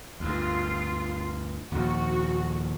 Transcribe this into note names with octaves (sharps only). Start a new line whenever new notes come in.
D2 G2 F4
D#2 A#2 F3 F#4